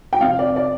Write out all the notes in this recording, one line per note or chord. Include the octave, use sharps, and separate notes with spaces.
G5
F2 C3 F3 F5
D5
D5